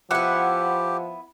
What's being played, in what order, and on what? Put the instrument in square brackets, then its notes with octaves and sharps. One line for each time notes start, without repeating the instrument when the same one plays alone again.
[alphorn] F3 [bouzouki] B3 E4 [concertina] G4 [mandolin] F#5